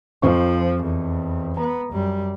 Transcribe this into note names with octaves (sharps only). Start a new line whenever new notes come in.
F2 F3 C5 C#6
E2
B3 A#5
F#2 G3